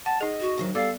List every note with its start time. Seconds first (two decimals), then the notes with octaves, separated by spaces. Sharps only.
0.06 F#5 A5
0.21 D#4 G#4 D#5
0.41 F#4
0.58 D2 D#3 F#3
0.75 G3 B3 A4 D5 F5 D6